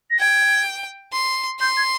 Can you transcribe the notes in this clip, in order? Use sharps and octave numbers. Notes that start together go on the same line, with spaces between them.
A#6
G5 G#6
C6
C6 G6
G#6